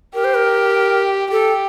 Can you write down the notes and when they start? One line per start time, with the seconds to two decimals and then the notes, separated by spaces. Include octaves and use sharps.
0.14 G4 A#4
0.24 C5
0.34 A#4
1.31 G4 A4